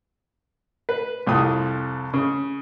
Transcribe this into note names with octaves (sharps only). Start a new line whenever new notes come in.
B4
C2 F2 G4 D#6
C#3